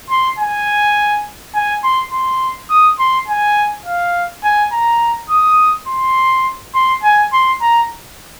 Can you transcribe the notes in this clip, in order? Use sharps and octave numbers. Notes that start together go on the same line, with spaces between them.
C6
G#5
G#5
C6
C6
D#6
C6
G#5
F5
G#5
A#5
D#6
C6
C6
G#5
C6
A#5